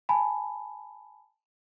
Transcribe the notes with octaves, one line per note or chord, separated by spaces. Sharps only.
G#5 A5 B5